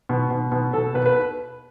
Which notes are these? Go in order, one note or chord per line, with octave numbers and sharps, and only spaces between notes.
B2
B2
B2
B2 A4
B2 B4
B4